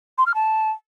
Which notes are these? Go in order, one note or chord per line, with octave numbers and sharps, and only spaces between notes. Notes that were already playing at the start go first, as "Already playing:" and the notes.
C6
F6
A5